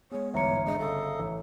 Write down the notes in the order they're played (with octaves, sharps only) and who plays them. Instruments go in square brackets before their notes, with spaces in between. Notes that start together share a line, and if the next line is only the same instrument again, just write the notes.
[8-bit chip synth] G#3 B3 [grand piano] G#4 [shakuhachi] C#5
[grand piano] G1 E2 G#2 [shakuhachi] C#5 [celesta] E5 A#5 C#7
[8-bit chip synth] G#3 D4 G#4 [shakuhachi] D#5
[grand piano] G1 C#3 [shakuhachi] A4 [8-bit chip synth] D#5 F5 D#6
[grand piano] A1